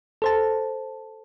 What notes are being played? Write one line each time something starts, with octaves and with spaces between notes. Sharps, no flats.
A4 C5 A5